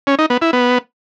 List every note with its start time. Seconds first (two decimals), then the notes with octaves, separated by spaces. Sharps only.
0.07 C#4
0.19 D#4
0.30 B3
0.42 E4
0.53 B3